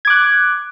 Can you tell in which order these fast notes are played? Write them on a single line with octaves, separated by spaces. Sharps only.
G#6 D6 F#6